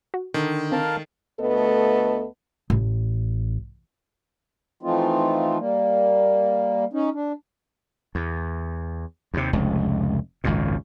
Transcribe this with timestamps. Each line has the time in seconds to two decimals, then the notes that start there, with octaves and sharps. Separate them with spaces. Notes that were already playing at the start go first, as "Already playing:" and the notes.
0.14 F#4
0.34 D3 D#3
0.72 C4 A#4 F5 A5
1.40 D2 A3 B3 A4 B4 D#5
2.70 A1
4.83 E3 F3 A3 C4 D#4 F4
5.58 G3 A#3
6.93 C#4 D#4
7.14 D4
8.15 E2
9.34 D#2 C3
9.53 F1 C#2
10.44 G#1 C#2 F#2 A#2